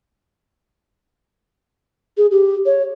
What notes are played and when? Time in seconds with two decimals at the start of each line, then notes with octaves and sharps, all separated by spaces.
2.17 G#4
2.31 G4
2.66 C#5